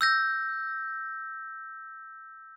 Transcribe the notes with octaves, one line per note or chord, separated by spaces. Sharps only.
E6 G6 A#6